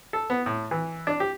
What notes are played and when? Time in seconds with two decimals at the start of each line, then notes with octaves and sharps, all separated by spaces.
0.13 A4
0.30 B3
0.46 A2
0.71 E3
1.07 D4
1.20 G4